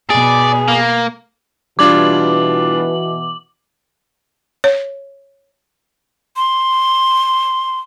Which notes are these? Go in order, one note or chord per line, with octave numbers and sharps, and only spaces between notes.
B2 B3 G#4 D5
A#3
B2 E3 G3 D4 F4 D6 F#7
C#5
C6